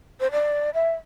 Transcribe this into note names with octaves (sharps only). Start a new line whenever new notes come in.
C5
D5
E5